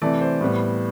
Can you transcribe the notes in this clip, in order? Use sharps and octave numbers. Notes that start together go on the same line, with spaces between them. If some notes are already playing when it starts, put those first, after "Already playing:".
C3 E3 A3 D5
C5
A2 G3 B3